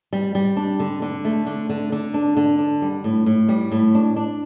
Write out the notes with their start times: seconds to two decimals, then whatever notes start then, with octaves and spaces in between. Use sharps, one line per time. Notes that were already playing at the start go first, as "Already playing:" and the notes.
0.13 G3
0.35 G3
0.57 D4
0.80 D3
1.02 D3
1.25 A3
1.47 D3
1.69 D3
1.92 D3
2.14 D4
2.37 D3
2.59 D4
2.82 G3
3.04 A2
3.26 A2
3.49 G3
3.72 A2
3.95 D4
4.16 D4